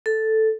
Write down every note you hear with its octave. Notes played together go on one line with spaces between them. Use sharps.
A4